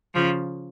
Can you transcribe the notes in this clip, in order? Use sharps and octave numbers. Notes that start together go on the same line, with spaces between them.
C#3 F3